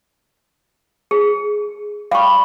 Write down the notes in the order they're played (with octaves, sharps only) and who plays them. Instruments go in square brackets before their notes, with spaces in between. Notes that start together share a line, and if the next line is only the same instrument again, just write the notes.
[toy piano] G#4
[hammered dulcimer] G3 [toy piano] F5 C#6